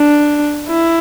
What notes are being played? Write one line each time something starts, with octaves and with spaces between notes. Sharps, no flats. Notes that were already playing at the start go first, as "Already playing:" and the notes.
Already playing: D4
E4